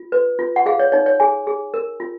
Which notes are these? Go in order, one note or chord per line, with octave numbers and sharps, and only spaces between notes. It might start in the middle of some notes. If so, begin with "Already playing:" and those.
Already playing: F4
B4
F4
F#5
G#4 F5
C#5
D#4 C#5
C#5
G#4 G#5
G#4
A#4
F4